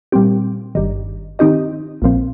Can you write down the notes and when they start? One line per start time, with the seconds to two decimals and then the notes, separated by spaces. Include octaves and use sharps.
0.12 A#2 G3 C4 G4
0.75 G1 G2 D#3
1.39 D#3 C4 D#4 G4 D#5
2.02 A#1 A#2 F3 C4